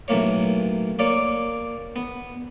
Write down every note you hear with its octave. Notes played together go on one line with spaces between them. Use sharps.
B1 A2 A#3 C#5
A#3 C#5 D5
B3